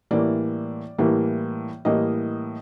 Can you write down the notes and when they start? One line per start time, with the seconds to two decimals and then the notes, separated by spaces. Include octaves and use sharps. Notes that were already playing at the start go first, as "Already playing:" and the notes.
0.11 A2 E3 G3 A#3 D5
0.98 A2 E3 G3 A#3
1.85 A2 E3 G3 A#3 D#5